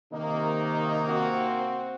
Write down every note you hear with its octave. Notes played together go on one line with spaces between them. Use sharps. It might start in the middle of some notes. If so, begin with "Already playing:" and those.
C3 D#3 A#3 D#4
C4 F#4